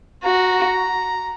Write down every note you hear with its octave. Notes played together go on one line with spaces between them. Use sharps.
F#4 A#5